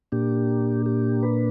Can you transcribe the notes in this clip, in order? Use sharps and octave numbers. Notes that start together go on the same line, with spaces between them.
A#2 A#3 D4 G4
G4
B4